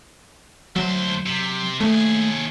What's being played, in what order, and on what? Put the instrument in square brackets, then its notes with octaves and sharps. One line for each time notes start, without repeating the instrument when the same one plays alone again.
[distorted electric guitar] D2 C5 [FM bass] F#3
[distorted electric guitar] C3
[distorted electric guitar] D#2 G#4 [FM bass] A3